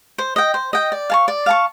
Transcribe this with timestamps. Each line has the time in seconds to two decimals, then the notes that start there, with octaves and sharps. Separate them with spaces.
0.18 C5
0.36 D#5 G5
0.54 C5
0.73 D#5 G5
0.92 D5
1.10 F5 A5 C#6
1.28 D5
1.46 F5 A5 C#6